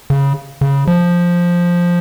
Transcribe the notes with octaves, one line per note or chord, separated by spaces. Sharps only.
C#3
C#3
F3